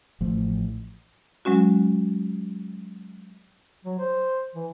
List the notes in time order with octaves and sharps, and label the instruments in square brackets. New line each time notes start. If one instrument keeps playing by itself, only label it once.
[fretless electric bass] A1 F3 A3
[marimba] F#3 G#3 C#4 F#4
[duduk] F#3
C5
E3